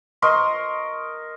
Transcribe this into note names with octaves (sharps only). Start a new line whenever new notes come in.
A#4 D#5 C6 C#6